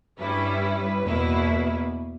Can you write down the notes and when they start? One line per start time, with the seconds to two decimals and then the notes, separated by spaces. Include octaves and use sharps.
0.19 G2 G3 C#4 E4 B4
0.61 B4
1.04 E2 B2 A#3 E4